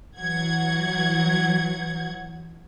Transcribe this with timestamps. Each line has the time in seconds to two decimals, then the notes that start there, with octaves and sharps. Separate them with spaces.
0.17 E3 F#3 F#5 G#6